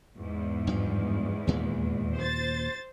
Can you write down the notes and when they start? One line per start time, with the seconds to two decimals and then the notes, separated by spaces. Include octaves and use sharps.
0.19 E2 G#2
0.67 G2 F3
1.47 D#2 A#2 G#3
2.16 C5 A6